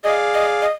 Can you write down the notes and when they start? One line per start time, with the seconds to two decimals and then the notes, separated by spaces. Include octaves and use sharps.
0.04 G#4 D5 D#5 F5
0.34 D#5
0.62 D#5